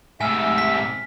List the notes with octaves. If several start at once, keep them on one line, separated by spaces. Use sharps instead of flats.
G#2 C3 A3 E5 G#5 E6 F6
B6